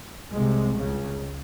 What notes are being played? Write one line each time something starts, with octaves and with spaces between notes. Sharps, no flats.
C2 C3 G#3
C#2 C#3